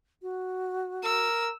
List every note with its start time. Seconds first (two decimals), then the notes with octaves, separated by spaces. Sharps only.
0.22 F#4
1.04 A#4 E6